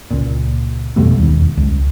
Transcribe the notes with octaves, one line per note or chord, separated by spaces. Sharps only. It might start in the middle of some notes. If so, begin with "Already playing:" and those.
C#2 A#2
F2 B2 G3 A3
E1 D#2
C#2